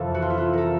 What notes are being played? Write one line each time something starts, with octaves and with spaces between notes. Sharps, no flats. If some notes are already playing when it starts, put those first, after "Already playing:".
Already playing: F2 C3 E3 A4
F#4
F4
E4
F4
A4 A#4